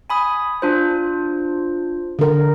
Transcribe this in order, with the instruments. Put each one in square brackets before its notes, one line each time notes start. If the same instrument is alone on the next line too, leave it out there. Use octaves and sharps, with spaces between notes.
[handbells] G#5 B5 D#6
D4 F4 C5
[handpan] D3 A#4